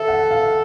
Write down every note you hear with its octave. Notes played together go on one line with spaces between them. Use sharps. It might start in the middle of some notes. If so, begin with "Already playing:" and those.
Already playing: A4 E5
F#5
F5